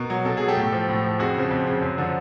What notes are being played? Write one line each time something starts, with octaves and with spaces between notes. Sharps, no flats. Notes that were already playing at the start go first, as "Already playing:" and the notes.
Already playing: B2 A#4
F#3
B2 A4
F#3 G#4
G4 A4
A2
F3
A2
F3
F2 F#4 G#4
C#3 F3
F2
C#3 F3
F#2
D3 F3